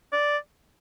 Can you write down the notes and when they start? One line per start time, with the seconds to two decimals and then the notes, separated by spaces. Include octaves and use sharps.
0.12 D5